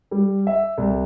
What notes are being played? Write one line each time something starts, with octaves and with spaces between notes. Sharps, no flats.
G3
E5
C2